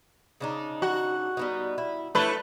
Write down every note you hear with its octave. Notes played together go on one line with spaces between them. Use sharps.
C#3 D4 D#4
F#4
G3 B3 D#4
E4
A3 D4 E4 B4 C#5